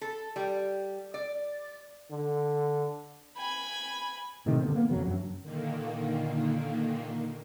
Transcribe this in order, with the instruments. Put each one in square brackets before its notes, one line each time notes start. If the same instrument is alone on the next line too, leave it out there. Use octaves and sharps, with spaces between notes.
[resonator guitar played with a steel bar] A4
G3
D5
[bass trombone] D3
[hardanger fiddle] G#5 B5
[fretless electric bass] A2 C3 D#3 A3
G2 D3 B3 C4
A#3 B3
D#1 F2 C#3 F#3
F#2 F#3 D4
[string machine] A#2 D3 D#3 A#3